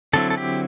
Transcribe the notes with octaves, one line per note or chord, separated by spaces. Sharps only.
D3 F#3 C4 E4 A4
A4
G4